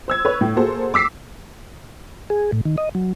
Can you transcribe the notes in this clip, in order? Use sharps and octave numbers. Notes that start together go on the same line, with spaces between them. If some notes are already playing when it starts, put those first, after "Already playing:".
C5 E6 G#6
B4 C#5
A2
A#3 F#4 G#4 A4 C5
D6 E6 B6 C7
G#4
A2
D#3
D#5
F#3